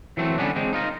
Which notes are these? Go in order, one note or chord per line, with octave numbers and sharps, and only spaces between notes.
E3 F#3 A3 C4
D3 G3 A3 B3 C#4 D4
G#3 C4 D4
D#4 F4 A#4